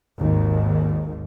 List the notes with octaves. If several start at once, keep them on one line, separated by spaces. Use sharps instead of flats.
G#1 D#2 D#3